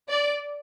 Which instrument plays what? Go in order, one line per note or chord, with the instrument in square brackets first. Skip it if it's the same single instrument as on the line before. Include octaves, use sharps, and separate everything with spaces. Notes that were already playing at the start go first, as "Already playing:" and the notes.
[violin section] D5